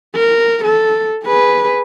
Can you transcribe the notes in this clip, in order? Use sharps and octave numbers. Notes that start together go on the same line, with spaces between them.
A#4
A4
G#4 B4